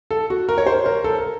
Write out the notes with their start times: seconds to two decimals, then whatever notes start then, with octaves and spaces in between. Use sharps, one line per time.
0.11 A4
0.30 F#4
0.49 A#4
0.58 C#5
0.66 C5
0.86 A#4
1.04 A4
1.18 A#4